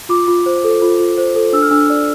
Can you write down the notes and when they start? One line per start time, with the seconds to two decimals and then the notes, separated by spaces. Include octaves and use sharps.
0.09 F4 D6
0.28 F4
0.46 C5
0.64 A4
0.82 F4
0.99 F4
1.18 C5
1.36 A4
1.53 D4 E6
1.62 F6
1.71 D4 E6
1.90 D5